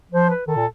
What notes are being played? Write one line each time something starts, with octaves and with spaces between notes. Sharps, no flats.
F3 C5
B4
D#3 A4
A#2